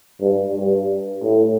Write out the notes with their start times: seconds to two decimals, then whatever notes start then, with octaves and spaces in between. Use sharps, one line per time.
0.21 G2
0.55 G2
1.23 A2